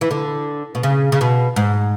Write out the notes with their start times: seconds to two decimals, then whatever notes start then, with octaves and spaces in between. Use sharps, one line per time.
0.01 E3
0.11 D3
0.75 B2
0.83 C#3
1.12 C#3
1.21 B2
1.56 G#2